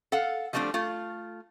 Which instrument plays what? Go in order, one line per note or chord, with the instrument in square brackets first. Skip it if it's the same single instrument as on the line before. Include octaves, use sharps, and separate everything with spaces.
[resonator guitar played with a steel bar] A4 F5 F#5
F3 G3 A3 C4 D4
A3 F4